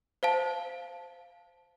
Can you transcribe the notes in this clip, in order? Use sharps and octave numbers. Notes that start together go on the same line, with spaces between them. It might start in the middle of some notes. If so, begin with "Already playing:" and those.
C5 F5 A5